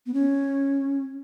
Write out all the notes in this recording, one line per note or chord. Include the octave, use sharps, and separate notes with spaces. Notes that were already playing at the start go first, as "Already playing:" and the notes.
B3
C#4